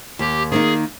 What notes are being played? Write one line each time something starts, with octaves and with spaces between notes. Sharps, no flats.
D#2 G4
D#3 A#3 D#4 G#4